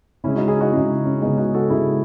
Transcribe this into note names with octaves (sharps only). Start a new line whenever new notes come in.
C#3 G#3 C#4 E4
D#4 F#4
E4 G#4
D#4 F#4
C#3 G#3 C#4 E4
C#4
C#3 G#3 B3 D#4
D#4 F#4
F#4 A4
C#3 G#3 E4 G#4